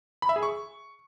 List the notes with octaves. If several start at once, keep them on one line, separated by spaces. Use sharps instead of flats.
B5
E5
G#4
C#6